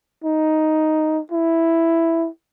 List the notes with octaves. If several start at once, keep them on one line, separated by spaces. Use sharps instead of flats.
D#4
E4